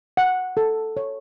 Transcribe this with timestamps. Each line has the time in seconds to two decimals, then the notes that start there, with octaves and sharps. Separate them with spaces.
0.17 F#5
0.57 A4
0.97 C#5